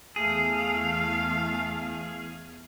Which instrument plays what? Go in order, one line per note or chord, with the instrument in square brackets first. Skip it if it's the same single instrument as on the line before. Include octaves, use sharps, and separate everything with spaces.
[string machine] E2 [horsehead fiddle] A3 F5 [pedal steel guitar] G#4